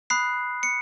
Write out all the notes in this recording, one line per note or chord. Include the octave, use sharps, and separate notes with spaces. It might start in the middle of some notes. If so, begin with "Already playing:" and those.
B5 D#6 F#6 C7
C#7